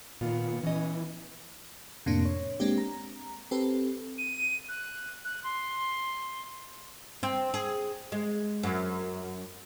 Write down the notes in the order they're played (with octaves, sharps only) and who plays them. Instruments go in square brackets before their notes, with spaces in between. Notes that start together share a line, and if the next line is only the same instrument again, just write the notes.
[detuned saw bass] A#2 [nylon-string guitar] D#3 B3 F4
[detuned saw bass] E3 [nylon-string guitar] C#4 D#5
[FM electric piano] F2 A2 C3 A#3 D4
C#5
G#3 A#3 C4 D4 G4
A#5
C4 G4 A4 B4
[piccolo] D#7
F#6
F#6
C6
[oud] C4
G#4
G#3
F#2